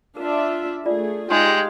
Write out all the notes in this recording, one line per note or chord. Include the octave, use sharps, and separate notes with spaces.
D4 F4 A#4 E5
A3 F4 G#4 D5
G#3 D#4 F4 G4 G5